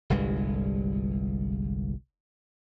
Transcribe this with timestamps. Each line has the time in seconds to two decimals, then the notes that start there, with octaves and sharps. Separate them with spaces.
0.10 G1 C2 G2 G#3